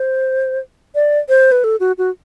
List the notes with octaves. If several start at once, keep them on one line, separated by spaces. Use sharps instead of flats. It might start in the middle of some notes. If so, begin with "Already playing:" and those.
Already playing: C5
D5
C5
B4
A4
F#4
F#4